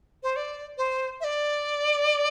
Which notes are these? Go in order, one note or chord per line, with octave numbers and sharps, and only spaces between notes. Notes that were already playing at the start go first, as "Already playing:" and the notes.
C5
D5
C5
E5
D5